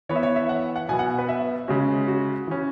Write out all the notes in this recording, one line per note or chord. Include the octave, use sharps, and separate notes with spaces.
E3 B3 C#5
E5
C#5
E5
F#5
F#5
B2 F#3 B3 G#5
F#5
B4
E5
C#3 G#3 C#4 F#4
F#4
E3 C#4